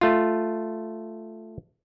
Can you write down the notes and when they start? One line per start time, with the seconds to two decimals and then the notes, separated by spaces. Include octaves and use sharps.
0.01 A3 F4